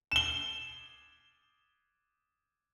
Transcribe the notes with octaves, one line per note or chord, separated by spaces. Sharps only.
E7 G7